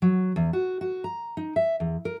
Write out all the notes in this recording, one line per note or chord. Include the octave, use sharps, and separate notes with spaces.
F#3
E2
F#4
F#4
A#5
D#4
E5
E2
A#4